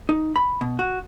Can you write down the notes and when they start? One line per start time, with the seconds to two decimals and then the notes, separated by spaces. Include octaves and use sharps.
0.09 D#4
0.36 B5
0.61 B2
0.79 F#4